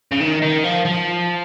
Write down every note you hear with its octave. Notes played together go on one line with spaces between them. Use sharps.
C#3
D#3
D#3
F3
F3